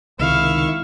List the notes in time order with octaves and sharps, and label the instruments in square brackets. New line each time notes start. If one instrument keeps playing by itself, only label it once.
[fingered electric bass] C#2 C3 [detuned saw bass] D#3 [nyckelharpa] E4 [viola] F5 C#6